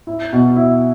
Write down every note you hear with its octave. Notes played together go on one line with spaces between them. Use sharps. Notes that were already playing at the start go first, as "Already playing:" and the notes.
E4
B2
E4